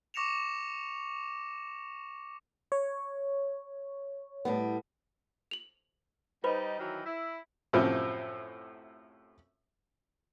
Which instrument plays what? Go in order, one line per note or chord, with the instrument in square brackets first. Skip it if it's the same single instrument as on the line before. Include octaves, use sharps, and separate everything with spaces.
[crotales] C#6 D6 A#6 C#7 E7 F7
[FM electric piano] C#5
[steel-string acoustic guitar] A2 G3 B3
[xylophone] F7 F#7
[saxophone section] G3 D#4 [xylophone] B4 C5 B5
[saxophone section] D#3 E3 F#3
E4
[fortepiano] F#2 A2 C3 F3